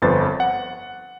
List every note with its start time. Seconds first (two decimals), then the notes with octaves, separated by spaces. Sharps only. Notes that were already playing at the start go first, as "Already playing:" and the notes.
0.02 G1 F2 B4 C5 A6
0.40 F#5